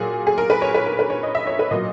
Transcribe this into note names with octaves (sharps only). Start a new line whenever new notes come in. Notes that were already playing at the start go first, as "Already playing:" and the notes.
Already playing: A#2 F#3 G#4
G#4
A#4
B4
C#5
B4
A#4
B4
C#5
D#5
E5
C#5
B4
A#2 F#3 D#5